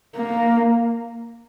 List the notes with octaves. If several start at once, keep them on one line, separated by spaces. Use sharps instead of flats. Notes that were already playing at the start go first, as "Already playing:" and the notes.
A#3